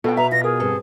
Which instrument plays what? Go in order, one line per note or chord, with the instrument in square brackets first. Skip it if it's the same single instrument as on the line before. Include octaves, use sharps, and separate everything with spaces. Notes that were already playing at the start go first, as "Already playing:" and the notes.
[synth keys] B2 [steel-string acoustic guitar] F4 [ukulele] A4 G5
[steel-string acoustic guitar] B4 [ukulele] E5 [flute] A#5
[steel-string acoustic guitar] F4 [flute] A#6
[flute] G#4 [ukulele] A#4
[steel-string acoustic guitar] G2 C4 A4